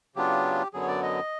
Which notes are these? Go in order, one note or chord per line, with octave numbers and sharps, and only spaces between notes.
C#3 F#3 B3 D4 F4 G4
F#2 D3 F#3 B3 G#4
C#5
D5
D#5